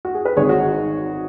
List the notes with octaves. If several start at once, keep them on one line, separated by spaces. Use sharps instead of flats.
F#4
G#4
B4
G#1 G#4 C#5
F#4
D#4